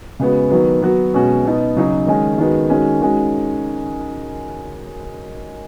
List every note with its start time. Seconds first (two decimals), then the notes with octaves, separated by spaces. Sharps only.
0.20 C#3 G#3 B3 F#4
0.50 D#3 F#3 B3
0.82 F#3 B3 F#4
1.14 B2 G#3 C#4 F#4
1.45 B2 B3 D#4
1.76 C#3 F#3 D#4 F#4
2.07 D#3 G#3 C#4
2.38 D#3 G#3 B3 D#4 F#4
2.70 D#3 G#3 C#4 F#4
3.02 D#3 G#3 C#4 F#4